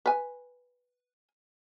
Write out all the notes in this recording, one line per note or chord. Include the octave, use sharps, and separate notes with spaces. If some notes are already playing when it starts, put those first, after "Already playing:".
B4 G#5